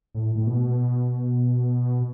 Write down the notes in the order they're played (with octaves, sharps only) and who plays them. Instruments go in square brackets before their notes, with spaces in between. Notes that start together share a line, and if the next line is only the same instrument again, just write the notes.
[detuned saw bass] A2
A2
B2